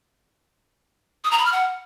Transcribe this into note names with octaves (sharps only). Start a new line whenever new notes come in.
D#6
A#5
B5
F6
F#5